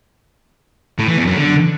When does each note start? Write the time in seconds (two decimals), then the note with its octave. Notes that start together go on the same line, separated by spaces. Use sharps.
0.99 A2
1.08 E3
1.17 E2
1.27 F#2
1.36 D3